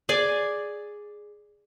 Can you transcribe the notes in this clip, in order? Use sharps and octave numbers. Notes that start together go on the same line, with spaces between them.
G#4 D5 G#5